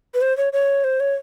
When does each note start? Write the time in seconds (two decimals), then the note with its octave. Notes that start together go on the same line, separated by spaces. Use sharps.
0.14 B4
0.21 C5
0.37 C#5
0.53 C#5
0.84 C5
1.00 C#5